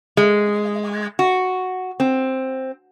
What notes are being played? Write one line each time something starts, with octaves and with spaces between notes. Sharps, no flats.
G#3
F#4
C4